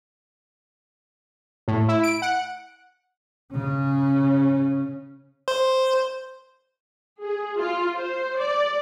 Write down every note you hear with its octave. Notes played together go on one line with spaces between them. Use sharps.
A2
E4
D7
F#5
C#3 C#4
C5
G#4
F4
C5
D5